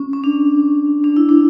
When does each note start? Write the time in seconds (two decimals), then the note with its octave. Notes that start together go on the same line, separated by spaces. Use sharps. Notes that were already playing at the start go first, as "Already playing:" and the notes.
Already playing: C#4
0.13 C#4
0.24 D4
1.04 D4
1.16 E4
1.29 D4